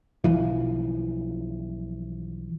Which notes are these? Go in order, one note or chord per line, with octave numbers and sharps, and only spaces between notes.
B1 E3 F3